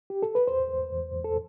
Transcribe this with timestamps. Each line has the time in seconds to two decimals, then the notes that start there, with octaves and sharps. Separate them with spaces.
0.10 G4
0.22 A4
0.35 B4
0.47 E2 C5
0.70 E2
0.92 E2
1.14 E2
1.24 A4